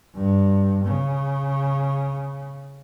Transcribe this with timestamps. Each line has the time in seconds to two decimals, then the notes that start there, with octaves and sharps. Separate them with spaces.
0.15 G2
0.85 C#3